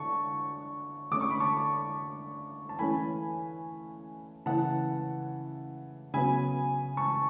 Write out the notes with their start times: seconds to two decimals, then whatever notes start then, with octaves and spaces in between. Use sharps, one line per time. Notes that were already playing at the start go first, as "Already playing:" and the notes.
Already playing: D3 A5 C#6
1.11 D3 A3 C#4 D6
1.21 C#6
1.30 B5
1.40 A5 C#6
2.69 A5
2.79 E3 A3 C#4 G#5 B5
4.46 C#3 E3 A3 C#4 F#5 A5
6.14 C#3 F#3 B3 G#5 B5
6.97 A5 C#6